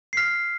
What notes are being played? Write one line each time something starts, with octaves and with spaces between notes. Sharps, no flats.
C7
F6 B6